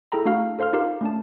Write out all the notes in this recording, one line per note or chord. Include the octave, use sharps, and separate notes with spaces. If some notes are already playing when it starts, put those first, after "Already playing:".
E4 G#4 A4 G5 A#5 B5
A3 D4 F#4 F5 F6
A4 C5 F5 C6 F6
D#4 F4 G4 A#4 F5
A3 C#4 D4 A5